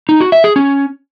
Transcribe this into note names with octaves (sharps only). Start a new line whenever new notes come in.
D#4
F#4
E5
G#4
C#4